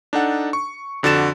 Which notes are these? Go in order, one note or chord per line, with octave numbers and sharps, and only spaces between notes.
D4 D#4 A4 F#5
C#6
F2 D3 F#4 A6 E7